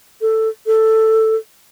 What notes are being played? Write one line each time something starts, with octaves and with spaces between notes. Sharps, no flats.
A4
A4